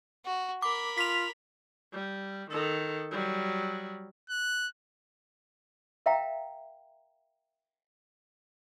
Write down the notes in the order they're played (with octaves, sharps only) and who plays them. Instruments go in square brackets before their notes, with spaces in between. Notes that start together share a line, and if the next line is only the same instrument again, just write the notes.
[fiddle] F#4
[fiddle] A#4 B5 [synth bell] D6
[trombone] F4 [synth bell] B6 F7
[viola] G3
D#3 A4
F#3 G3
[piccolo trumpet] F#6
[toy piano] A#4 E5 F5 G5 A#5